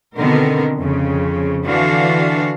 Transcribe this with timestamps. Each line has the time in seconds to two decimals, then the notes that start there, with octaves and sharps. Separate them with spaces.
0.17 B2 D3 D#3 B3 C4 A#4
0.78 F2 C#3
1.64 D3 E3 D4 F#4 F5